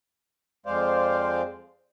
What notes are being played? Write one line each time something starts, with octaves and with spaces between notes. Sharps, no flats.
F2 G#3 C5 D5 F5